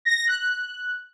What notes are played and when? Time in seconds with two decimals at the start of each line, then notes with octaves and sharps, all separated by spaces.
0.05 A#6
0.16 A#6
0.27 F#6
0.38 F#6